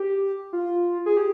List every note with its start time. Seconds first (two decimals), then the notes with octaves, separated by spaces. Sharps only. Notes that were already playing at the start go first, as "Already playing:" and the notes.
Already playing: G4
0.53 F4
1.06 G#4
1.17 G4